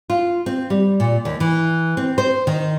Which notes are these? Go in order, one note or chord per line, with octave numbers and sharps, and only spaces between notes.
F4
C4
G3
A#2
D#2
E3
C4
C5
D#3